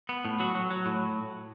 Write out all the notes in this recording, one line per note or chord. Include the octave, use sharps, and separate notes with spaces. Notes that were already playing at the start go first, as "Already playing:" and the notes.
B3
A2
F#3 F#4
F#3
F#3
A2